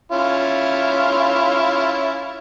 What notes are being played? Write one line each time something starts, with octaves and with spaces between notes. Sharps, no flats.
C#4 E4 F4